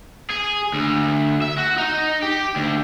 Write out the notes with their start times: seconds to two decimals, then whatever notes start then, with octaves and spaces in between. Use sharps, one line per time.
0.30 G#4
0.74 D2
1.42 E5
1.58 F#4
1.78 D#4
2.23 G4
2.56 D2